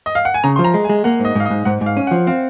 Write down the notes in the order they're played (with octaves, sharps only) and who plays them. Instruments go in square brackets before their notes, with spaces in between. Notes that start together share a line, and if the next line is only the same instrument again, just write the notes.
[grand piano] D#5
F5
F#5
G#5
[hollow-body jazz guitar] C#3 [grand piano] A#5
[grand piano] C6
[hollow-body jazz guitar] F3
[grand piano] A#5
[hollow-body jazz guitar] G#3
[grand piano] G#5
[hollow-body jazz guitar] G#3
[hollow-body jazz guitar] A#3 [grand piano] F#5
[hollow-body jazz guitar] G#2 [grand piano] D#5
[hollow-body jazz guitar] G#2 [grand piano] F5
[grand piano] D#5
[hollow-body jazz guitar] G#2
[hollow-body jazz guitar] G#2 [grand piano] F#5
[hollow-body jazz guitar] G#2
[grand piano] F5
[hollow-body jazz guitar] C#4
[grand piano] F#5
[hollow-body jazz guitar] F3
[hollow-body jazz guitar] C4 [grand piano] F5